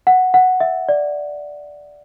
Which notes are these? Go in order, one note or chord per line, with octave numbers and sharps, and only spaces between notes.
F#5
F#5
E5
D5